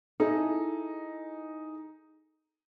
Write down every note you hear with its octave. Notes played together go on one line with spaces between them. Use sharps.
D#4 E4 G#4 A4